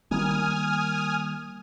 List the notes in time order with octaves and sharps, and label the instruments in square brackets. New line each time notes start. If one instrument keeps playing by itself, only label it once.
[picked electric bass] D#3 G3 A#3 [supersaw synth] G#5 D#6 F6